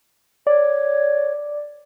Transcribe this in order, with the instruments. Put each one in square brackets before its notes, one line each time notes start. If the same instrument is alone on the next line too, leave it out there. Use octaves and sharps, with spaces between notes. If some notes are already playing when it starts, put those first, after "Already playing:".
[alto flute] C#5 [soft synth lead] D5